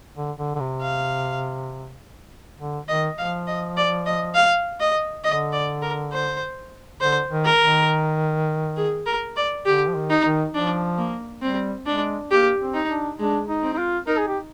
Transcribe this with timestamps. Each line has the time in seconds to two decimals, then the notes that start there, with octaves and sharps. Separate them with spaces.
0.16 D3
0.38 D3
0.55 D3
0.60 C3
0.82 F5
2.59 D3
2.88 D#3 D#5
3.18 F3 F5
3.47 D#5
3.77 D5
4.06 D#5
4.35 F5
4.80 D#5
5.24 D3 D#5
5.53 D5
5.82 A#4
6.13 C5
7.01 D3 C5
7.30 D#3
7.45 A#4
7.60 D#3
8.77 G#4
9.06 A#4
9.37 D5
9.66 D3 G4
9.88 F3
9.95 D#3
10.10 D#4
10.24 D#3
10.54 F3 D4
10.98 A#3
11.42 G3 C4
11.86 G#3 D4
12.31 A#3 G4
12.59 C4
12.74 D#4
12.89 D4
13.19 G#3 D4
13.49 D#4
13.63 C4
13.74 D#4
13.78 F4
14.07 D#4 A#4
14.17 G#4
14.28 G4